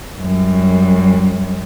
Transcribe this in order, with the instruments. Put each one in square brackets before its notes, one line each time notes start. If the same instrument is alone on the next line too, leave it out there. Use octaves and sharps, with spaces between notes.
[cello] F#2 G3